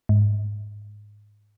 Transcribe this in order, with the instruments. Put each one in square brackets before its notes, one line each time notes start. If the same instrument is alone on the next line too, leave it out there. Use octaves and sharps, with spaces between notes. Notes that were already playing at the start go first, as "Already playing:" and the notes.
[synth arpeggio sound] G#2